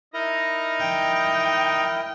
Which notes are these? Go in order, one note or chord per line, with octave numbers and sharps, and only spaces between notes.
D#4 E4 A#4 D#5 A#5
G5